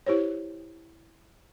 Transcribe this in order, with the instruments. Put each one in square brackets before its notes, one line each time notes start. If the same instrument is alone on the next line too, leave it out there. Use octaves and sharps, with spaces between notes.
[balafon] E4 G4 C5 C#5